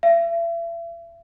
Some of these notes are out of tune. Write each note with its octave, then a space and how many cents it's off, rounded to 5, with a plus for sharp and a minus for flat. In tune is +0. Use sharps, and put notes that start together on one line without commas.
E5 +40